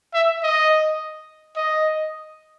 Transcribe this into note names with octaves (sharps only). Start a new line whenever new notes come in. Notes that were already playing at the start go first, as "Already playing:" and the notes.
E5
D#5
D#5